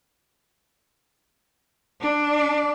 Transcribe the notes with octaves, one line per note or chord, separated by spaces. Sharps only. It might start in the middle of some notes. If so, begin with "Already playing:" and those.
D4